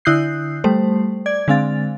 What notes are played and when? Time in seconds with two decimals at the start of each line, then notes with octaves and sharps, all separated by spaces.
0.05 D3 E4 D#6 F#6 G6 C7
0.64 G3 A3 C5
1.26 D5 G#6
1.48 D3 G#3 C4 F5 A6